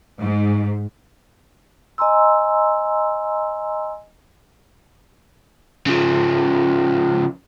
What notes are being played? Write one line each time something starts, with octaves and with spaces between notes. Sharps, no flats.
G#2
D#5 G#5 A#5 C6 E6
C#3 F3